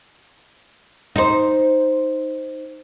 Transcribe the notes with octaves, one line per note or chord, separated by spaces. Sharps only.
D#4 C5